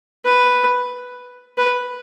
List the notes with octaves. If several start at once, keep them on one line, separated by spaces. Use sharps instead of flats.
B4
B4